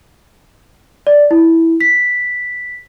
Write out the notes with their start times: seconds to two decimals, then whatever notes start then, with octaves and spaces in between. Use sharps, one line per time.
1.07 D5
1.31 E4
1.80 B6